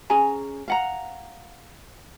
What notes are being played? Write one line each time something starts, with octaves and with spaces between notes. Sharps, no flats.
C#4 G#4 G#5 A#5
F5 F#5 A#5